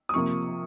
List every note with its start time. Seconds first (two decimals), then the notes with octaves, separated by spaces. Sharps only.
0.09 D#6
0.14 C3 F3 A#3 C#6